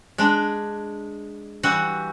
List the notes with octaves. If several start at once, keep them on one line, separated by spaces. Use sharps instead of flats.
G#3 D4
E3 G3 F#4